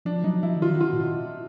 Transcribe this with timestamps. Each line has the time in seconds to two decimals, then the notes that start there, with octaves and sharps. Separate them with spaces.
0.05 F3 D4
0.24 F#3 D#4
0.43 F3 E4
0.57 E3
0.62 D#3 F4
0.75 F#4
0.81 F4
0.93 A#2